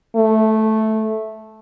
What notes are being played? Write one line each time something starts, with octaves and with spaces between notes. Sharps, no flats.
A3